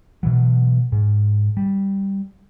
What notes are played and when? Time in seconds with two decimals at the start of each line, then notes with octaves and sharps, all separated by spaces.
0.23 B2 E3 F#3
0.92 G#2
1.57 G3